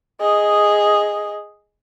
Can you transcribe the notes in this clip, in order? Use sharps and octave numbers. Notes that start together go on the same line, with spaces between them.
G#4 D#5